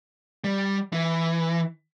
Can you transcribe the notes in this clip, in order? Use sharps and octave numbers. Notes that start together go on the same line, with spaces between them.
G3
E3